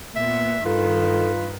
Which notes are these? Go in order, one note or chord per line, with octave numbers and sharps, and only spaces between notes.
A#2 B3 E5
G2 D#3 F4 A4 B4